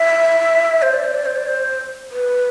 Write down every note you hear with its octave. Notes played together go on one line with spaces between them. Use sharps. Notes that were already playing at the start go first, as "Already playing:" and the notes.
Already playing: E5
C5
D5
C5
D5
C5
D5
C5
B4